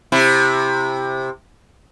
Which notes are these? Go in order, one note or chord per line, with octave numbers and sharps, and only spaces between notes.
C3 E4